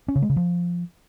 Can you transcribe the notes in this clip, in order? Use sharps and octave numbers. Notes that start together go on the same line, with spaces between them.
C#4
C#3
G#3
C#3
F3